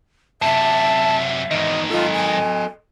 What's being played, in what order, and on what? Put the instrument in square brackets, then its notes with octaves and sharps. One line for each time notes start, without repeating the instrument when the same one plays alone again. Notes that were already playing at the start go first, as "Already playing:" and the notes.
[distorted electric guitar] F#2 C3 [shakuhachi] E5 [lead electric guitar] A5
[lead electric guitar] E2 D#5 [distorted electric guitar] G#2 D#3
[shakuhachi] F4 [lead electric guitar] A4 D#5
[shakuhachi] G#5